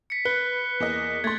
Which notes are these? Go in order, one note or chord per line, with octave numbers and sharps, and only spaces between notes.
B6 C#7
B4 F#6 C#7 G7
E2 A#3 D#5
A3 C6 G#6 A6